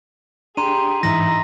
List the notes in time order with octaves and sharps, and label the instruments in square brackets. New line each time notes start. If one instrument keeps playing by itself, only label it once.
[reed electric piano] D4 [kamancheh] G4 G#4 [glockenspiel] A#5 C6 D#7
[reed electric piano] G#2 E3 [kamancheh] D#4 E4 [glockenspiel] A#6